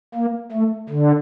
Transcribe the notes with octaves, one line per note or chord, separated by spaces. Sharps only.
A#3
A3
D3